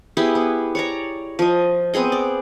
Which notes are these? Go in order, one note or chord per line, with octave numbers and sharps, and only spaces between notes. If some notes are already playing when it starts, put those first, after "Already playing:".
B3 E4 G4 G#4
B3
C#5 D5 A#5
F3 D#5
B3 C4 G#4 D#5
D5